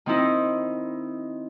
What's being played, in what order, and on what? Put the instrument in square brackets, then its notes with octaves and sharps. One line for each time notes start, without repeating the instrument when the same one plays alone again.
[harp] D#3 C4 D#4 E4